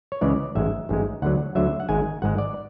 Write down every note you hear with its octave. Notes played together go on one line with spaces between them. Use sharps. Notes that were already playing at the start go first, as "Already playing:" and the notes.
C#5
C#2 C#3 E3 G#3 D5
A1 G#2 G#3 E5
A1 G#2 G#3
D2 D3 F#3 F#5
D2 D3 F#3 E5
F#5
G#1 G#2 G#3 G#5
G#1 G#2 G#3 F#5
D5